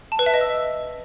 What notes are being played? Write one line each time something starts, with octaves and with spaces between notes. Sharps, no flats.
A5
B4
E5
D#5
E6